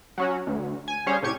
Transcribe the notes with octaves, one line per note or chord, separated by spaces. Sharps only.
F#3 C#4 F#4
D2
G#5
G3 C#4 G#4 C5 C#5 F5
A2 C3 G4 C#6 G#6